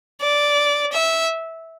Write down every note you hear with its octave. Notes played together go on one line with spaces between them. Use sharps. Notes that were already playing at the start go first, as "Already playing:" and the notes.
D5
E5